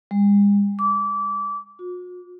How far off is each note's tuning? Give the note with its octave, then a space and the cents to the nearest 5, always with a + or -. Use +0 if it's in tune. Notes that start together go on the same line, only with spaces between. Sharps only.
G#3 -45
D6 -25
F#4 -45